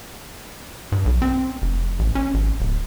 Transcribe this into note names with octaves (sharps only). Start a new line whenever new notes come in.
G2
B1
C4
F1
A1
C#4
G#1
D1